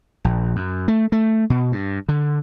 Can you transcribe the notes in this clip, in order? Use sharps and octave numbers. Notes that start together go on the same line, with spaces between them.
A#1
F#2
A3
A3
B2
G2
D3